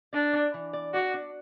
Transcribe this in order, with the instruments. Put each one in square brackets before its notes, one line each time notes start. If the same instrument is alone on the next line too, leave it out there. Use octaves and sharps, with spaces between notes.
[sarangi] D4 [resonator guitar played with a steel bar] D5
[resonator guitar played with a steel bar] D5
E3
D5
[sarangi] F#4 [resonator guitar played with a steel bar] D5
[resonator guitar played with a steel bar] D4